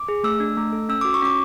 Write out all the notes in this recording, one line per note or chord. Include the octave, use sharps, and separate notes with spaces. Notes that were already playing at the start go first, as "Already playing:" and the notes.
Already playing: D6
G#4
A3 E6
D4
A3
A4
C#4 E6
F#4 D6
C#6
C#4 D6